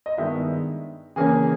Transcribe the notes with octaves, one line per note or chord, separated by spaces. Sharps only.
D#5
G2 D#3 G#3 B3 E4 E5
C#3 E3 A#3 C#4 G#4 G#5